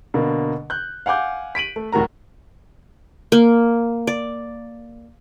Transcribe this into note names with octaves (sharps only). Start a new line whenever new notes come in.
B2 D3 A#3
F#6 G6
F5 F#5 G#5 D6 G6
B6 D7 D#7 F#7
A3
D1 A2 F#4 A#4 A#5
A#3
D5